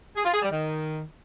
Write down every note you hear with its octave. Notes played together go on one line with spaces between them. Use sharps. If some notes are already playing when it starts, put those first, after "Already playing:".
G#4
F4
G#4
G3
D#3